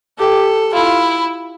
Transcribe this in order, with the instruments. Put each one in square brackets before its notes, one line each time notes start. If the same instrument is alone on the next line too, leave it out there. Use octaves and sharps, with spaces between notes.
[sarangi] G4 [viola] A4
[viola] E4 [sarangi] F4